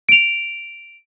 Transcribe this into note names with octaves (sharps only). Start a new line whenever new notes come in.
D7 F7